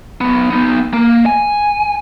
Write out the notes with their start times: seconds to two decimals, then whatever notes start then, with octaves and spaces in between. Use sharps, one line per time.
0.21 F#3 B3
0.50 B3 D#4
0.93 A#3
1.26 G#5